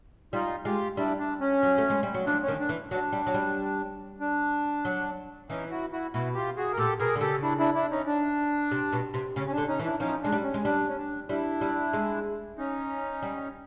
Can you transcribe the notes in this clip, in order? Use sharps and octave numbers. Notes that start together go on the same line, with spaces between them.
G3 D#4 F4
G#3 F4 G4
G3 D4 E4
D4
C#4
F#3
A3
G#3
G3
F#3
F3 D4
C#4
D#3
D4
E3
F#3 D4
G3
F#3
G3
D4
F#3
E3 C#4 D#4
E4 F#4
E4 F#4
B2 E4 F#4
F4 G4
F#4 G#4
A#4
A#2 G4 A4
B2 G#4 A#4
D3
C#3 G4 A4
D4 E4
D4 E4
D4 E4
C#4 D#4
D4
C3
B2
C3
C#3 C#4
C#4
D4
D3
C#4 D#4
E3
D4 E4
F3 C#4 D#4
G#3 D4
G3
C#4
G#3
G3 D4
C#4
D4
G3 D4 E4
G3
G#3
C#4 D#4
G3